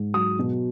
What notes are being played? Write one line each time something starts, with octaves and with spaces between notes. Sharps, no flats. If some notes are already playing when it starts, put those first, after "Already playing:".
Already playing: G#2
F#3 D#6
B2